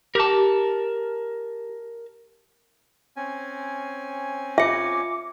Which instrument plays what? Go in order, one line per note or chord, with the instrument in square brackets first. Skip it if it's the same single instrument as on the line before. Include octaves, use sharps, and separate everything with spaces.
[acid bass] G4 [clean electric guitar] A#4 A5
[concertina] C4 C#4 G#5
[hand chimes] F4 C#7 [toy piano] E5 [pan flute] D6